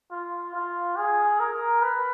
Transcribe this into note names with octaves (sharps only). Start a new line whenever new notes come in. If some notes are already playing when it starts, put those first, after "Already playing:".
F4
F4
G#4
A#4
B4